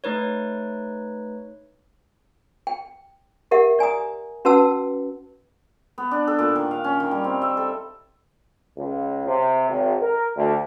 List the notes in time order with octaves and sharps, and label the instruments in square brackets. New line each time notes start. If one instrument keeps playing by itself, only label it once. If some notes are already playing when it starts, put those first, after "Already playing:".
[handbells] A3 D#4 B4 C#5
[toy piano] G5
G4 A#4 E5 F#5
D5 G#5 A#5 D#6
C#4 F#4 B4 F#5 A5 E6
[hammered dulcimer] B3
D4
A4
A#2
D#3
F5
C#4
D#3
G3
C4
E5
A4
[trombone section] C#2
C3
G#1
A#4
D2